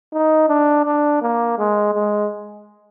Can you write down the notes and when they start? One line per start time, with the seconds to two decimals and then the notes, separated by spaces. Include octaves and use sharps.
0.13 D#4
0.49 D4
0.85 D4
1.22 A#3
1.58 G#3
1.94 G#3